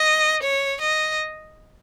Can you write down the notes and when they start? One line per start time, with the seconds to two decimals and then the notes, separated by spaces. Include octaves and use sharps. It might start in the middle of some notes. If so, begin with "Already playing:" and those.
Already playing: D#5
0.43 C#5
0.81 D#5